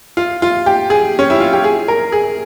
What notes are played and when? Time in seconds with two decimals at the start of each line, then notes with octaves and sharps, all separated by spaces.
0.17 F4
0.42 F4
0.66 G4
0.90 G#4
1.19 C#4
1.30 E4
1.40 F4
1.53 G4
1.64 G#4
1.88 A#4
2.12 G#4